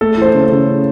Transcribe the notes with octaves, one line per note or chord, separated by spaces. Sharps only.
A3 A4
E3 C5
A4
C#3
C#3